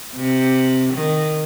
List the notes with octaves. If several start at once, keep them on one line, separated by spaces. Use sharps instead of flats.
C3
D#3